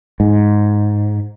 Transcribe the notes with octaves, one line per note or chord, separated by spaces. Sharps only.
G#2